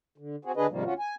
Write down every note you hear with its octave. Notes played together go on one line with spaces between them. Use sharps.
D3
C4 F#4 G#4
D3 D4 G#4 B4 D#5
G#2 C3 D#3 F3 G3 A#3
D2 C#4 F4 F#4
G#5